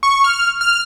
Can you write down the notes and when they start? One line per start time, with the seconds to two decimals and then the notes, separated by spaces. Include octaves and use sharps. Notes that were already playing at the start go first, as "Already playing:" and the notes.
0.03 C#6
0.24 F6
0.61 F6